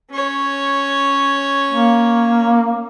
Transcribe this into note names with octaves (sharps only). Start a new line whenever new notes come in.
C#4 C#5
A#3